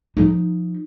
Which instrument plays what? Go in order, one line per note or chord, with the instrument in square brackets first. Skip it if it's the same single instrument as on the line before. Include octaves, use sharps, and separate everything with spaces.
[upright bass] F3 D#4